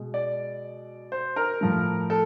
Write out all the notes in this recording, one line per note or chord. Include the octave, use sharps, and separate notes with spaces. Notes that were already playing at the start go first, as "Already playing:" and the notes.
Already playing: B2 G#3
D5
C5
A#4
A2 F3 A3
A4